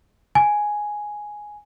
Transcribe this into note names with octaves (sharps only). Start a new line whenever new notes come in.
G#5